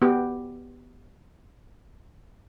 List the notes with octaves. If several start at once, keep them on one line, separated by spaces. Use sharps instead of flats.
B3 G4